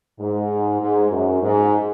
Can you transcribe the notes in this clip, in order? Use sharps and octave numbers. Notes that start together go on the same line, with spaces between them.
G#2
G#2
F#2
G#2